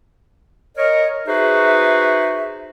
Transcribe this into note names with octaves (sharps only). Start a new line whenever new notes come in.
A#4 C#5 D#5
D#4 F#4 G#4 B4 C5 E5